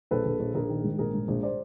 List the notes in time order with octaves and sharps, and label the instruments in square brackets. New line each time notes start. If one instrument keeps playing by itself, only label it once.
[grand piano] A#1 A4 B4
A#1
A#1
A#1 G#4 A#4
D#3
G#2
A#1 G#4 A#4
G#2
A#1
C5 D5